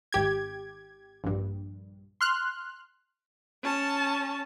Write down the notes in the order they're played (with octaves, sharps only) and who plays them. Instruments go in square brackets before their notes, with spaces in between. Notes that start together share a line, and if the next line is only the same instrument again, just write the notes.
[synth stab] G#1 G4 G#6
A#1 G2
C6 F6 F#6
[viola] C#4 A5